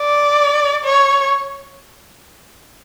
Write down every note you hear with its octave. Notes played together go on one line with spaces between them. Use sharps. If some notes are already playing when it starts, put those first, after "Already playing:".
Already playing: D5
C#5